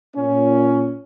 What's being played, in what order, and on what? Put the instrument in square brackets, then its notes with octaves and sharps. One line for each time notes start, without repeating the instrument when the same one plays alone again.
[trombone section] A#2 C#4